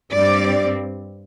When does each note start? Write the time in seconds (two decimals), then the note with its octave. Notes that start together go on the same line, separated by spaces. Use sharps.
0.12 G2 G3 C4 D5